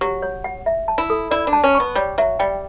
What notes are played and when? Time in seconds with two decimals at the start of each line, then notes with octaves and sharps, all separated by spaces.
0.01 F#3 G4
0.22 C#5
0.44 F#5
0.66 E5
0.88 A5
0.98 E4
1.10 A4
1.31 E4 D5
1.47 D4
1.53 A5
1.64 C#4
1.75 C#6
1.80 B3
1.95 G3 C#5
2.18 F#3 E5
2.39 G3 G5